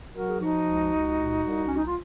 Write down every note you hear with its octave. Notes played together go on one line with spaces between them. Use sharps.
F#3 F#4 A#4
G#4
F3 D#4 F#4
C#2
C#2
A#2
C2
C2 C#4
D#4
F4